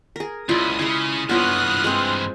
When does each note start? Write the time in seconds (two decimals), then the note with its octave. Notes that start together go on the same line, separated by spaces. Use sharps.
0.16 G#4 A#4
0.49 C#2 E4 F4 D5 D#6
0.79 C#3 G#3 E4
1.29 G2 E3 B3 F4 C#5 D#6 F6 F#6
1.84 G#3 C4